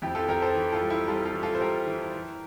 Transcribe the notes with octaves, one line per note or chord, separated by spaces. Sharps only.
F2 E4 G4
F4 A4
F2 G4 A#4
A4 C5
E3
F4 A4
G3
E4 G4
G3 F4 A4
F4 A4
E3
F4 A4
C5
G3 G4 A#4
E3
E3